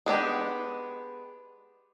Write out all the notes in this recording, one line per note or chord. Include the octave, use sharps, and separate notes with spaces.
G#3 B3 D4 G4